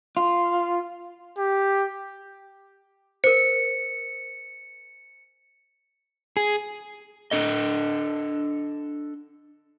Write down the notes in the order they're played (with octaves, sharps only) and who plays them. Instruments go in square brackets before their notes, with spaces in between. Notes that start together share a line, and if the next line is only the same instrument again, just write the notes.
[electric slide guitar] F4
[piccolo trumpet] G4
[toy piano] A#4 C5 [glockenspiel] C#7
[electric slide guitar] G#4
D4 A4 D#5